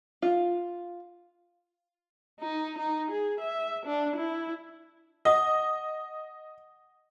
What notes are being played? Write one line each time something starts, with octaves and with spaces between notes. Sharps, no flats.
F4
D#4
D#4
G#4
E5
D4
E4
D#5 F#5 D#6